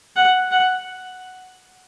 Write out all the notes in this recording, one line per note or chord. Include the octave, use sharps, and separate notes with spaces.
F#5
F#5